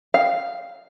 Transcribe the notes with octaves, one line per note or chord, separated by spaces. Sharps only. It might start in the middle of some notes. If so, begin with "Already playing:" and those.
F5